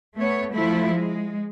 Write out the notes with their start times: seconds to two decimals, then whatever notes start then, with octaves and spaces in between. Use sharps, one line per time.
0.17 A3 B3 C#5
0.53 F3 A3 E4
0.93 G#3